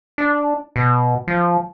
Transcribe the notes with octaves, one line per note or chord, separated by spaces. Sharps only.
D4
B2
F3